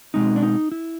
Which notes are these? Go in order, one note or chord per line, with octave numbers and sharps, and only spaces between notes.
B2 G#3 C4 D#4
D4
D#4
E4